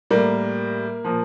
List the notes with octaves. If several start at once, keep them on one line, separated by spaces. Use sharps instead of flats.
A2 G3 A#3 A#4
A#2 F3